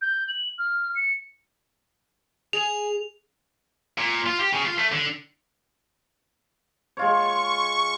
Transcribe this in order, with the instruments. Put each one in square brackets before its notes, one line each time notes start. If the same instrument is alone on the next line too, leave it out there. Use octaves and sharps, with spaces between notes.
[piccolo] G6
F#7
F6
C#7
[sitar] G#4 [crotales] F7
[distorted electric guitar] A#2
F4
G4
C#3
F4
A3
D3
[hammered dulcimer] G#3 F4 C#5 [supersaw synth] C#6